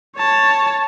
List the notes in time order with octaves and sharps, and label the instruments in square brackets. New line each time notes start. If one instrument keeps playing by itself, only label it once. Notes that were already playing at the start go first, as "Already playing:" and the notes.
[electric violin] C#5 A5